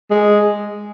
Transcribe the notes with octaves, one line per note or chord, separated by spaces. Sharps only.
G#3